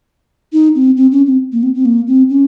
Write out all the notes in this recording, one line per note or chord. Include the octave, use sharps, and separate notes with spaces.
D#4
C4
C4
C#4
C4
A#3
C4
C4
A#3
C4
C#4